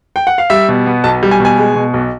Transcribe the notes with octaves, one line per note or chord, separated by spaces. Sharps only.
G5
F#5
F5
G3 E5
B2
B3
B1 A5
G3
G#5
B2
G#5
G#3
B2
B1